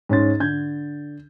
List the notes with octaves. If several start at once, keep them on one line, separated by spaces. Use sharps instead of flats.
G#2 C#4 C6 A6
D3 G6 G#6